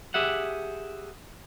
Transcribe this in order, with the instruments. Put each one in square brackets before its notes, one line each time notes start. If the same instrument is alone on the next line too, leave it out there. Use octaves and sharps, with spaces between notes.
[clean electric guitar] G4 G#4 E5 F#5